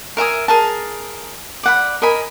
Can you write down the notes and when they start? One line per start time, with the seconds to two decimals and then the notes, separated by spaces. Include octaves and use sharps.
0.17 A#4 E5 G#5 D#6
0.48 G#4 A#4 A5
1.63 D5 F#5 B5
2.02 A#4 D#5 G#5 B5